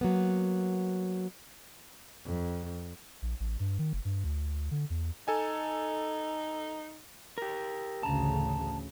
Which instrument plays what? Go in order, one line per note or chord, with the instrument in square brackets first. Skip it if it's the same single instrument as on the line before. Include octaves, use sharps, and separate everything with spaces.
[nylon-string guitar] F#3 A#3 B3
[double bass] F2
[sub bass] A#1
A1
G2
D#3
F#1
G2
D2
D3
E2
[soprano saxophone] D#4 [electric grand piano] A4 G#5
[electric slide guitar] G4 A#4
[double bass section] A1 D2 C#3 [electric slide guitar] A5 A#5